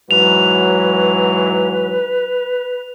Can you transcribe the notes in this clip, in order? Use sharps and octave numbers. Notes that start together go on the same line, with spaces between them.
G#2 E3 F#3 B4 F7